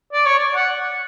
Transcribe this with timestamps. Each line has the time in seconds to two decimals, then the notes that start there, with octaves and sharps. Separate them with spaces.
0.13 D5
0.26 C#5
0.39 D5
0.55 F#5